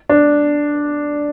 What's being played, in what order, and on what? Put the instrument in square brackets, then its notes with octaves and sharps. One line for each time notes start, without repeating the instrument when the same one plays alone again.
[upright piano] D4